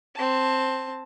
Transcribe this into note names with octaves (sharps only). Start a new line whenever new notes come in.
C4 A5